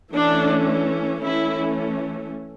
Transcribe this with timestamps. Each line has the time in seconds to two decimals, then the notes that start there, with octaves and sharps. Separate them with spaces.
0.14 E3 A3 C#4 D4
1.22 E3 A3 C#4 E4